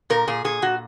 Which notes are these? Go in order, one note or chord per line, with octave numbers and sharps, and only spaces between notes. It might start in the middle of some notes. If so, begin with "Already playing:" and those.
A#2 A#4
A#2 G#4
A#2 G#4
A#2 F#4